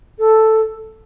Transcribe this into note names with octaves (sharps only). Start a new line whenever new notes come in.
A4